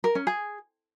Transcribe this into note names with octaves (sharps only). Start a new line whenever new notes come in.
A#4
C#4
G#4